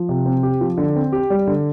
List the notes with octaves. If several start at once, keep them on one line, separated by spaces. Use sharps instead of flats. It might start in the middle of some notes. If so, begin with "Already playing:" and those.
Already playing: F3
C3
C4
G4
F3
D3
C4
G4
G3
D3